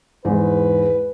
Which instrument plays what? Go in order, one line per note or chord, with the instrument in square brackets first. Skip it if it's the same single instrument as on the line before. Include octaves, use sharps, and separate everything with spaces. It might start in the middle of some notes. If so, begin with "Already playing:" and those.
[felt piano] E2 G#2 [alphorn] B4